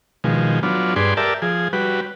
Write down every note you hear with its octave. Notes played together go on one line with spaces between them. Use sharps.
B2 D#3 F3 G#3
F#3 B3 D4 F4
G2 G#4 B4 D5 C6
G4 A#4 D5 E5 A5
F3 G#4
G3 F#4 B4